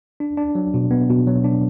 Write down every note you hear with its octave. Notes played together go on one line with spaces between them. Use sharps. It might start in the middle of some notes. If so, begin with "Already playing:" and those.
D4
D4
F#3
B2
B3
B2
F#3
D4